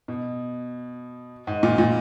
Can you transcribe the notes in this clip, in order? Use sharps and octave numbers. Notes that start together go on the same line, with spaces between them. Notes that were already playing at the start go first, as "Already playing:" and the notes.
B2
G#2
A#2
A#2